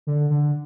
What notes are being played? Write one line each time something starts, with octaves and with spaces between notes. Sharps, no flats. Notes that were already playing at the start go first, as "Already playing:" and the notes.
D3
D3